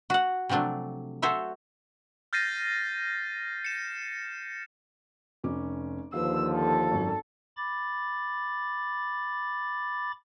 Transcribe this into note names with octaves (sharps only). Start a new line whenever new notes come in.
F#4 F#5
C3 F3 F#3 A3 D4
F#4 A4 C5 C#5 E5
F6 G6 A6 A#6 C7 D#7
C#7 E7
F1 C#4 D6
D#2 D3 F3 B4 C5 F5 E6
A4
G#1 F#2
B5 D6 A6